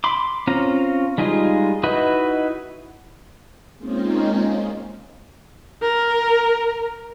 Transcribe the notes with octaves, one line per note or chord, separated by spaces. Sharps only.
B5 C6 D6
C4 C#4 F4 F5 A#5
G3 G#3 D#4 F4 G#4
D#4 E4 F#4 B4 D#5
G#3 A#3 C4 C#4 D#4 F4
A#4